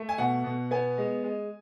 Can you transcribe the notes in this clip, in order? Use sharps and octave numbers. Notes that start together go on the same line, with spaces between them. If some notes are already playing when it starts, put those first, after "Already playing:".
Already playing: A3
G#5
B2 F#5
B2
B3 G#5
G#3
G#3